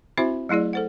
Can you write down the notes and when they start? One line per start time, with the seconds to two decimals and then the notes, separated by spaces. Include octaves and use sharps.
0.18 C4 E4 F#4 C5 E5 B5
0.49 F#3 A3 E4 G#4 D5
0.73 A4 C5 F#5